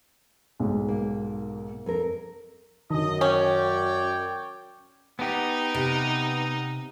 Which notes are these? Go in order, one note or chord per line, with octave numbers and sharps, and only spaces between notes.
B1 G#2
A#3
F2 A#4
F#2 D3 D#3 D#5
C#4 C#5 D5 G5
B3 D#4 G4
C3